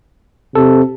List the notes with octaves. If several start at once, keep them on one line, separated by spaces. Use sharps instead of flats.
C3 A4